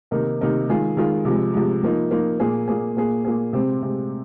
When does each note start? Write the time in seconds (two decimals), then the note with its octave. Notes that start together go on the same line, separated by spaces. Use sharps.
0.11 C3 D#3 A#3 D#4 A#4
0.41 C3 D#3 A#3 D#4 A#4
0.69 D#3 G#3 F4 G#4
0.97 D#3 G#3 F4 G#4
1.25 C3 F3 G#3
1.54 C3 F3 G#3
1.83 F3 A#3 D#4
2.11 F3 A#3 D#4
2.40 A#2 A#3 G#4
2.68 A#2 A#3 G#4
2.96 A#2 A#3 G#4
3.25 A#2 A#3 G#4
3.53 C3 G#3 C4
3.82 C3 G#3 C4